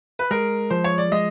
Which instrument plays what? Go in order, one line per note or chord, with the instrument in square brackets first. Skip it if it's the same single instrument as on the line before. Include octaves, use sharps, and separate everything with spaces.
[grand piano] B4
[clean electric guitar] G#3 [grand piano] A#4
[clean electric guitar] F3 [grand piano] C5
[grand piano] C#5
D5
[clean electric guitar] G#3 [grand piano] D#5